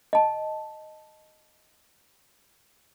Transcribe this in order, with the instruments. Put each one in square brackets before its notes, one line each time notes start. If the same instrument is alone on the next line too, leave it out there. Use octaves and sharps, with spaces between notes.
[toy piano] D#5 A5